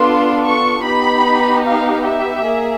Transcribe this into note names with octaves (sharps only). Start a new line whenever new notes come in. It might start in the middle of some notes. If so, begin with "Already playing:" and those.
Already playing: B3 D4 F4 A4 C6
C#6
B3 D#4 G4 B5
F5
E5
A#3 G#4